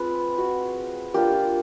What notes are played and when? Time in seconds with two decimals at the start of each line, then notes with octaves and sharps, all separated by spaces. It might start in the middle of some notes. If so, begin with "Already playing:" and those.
Already playing: G#3 C4 F4 B4
0.38 F#4
1.14 A#3 D4 F4 G4